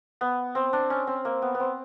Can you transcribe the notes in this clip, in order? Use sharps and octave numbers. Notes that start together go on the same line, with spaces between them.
B3
C4
D4
C#4
C4
A#3
B3
B3
C4